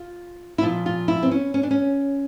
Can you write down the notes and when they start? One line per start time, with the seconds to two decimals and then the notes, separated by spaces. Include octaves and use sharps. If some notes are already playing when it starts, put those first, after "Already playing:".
Already playing: F4
0.58 E4
0.62 A#2 F3 F4
0.86 F4
1.08 E4
1.23 C4
1.31 C#4
1.54 C#4
1.63 D4
1.71 C#4